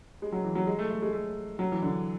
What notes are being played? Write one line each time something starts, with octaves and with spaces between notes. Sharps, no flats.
G#3
F#3
E3
F#3
G#3
A3
A3
G#3
A3
F#3
E3
D3